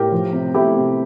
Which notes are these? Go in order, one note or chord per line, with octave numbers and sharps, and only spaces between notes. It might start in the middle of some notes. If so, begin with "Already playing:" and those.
Already playing: A2 G4 A#4
F3
C3
A3 E4 G4
C3